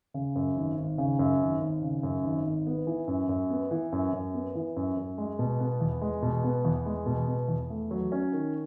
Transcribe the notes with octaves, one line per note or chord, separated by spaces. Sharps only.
C#3
F#2
G#1
G#1
C#3
F#2
G#1
G#1
C#3
F#2
G#1
G#1
B3
E3
F#2
F#2
B3
E3
F#2
F#2
B3
E3
F#2
F#2
G#3
B2
B3
E2
G#3
B2
B3
E2
G#3
B2
B3
E2
A3
F#3
C#4
D#3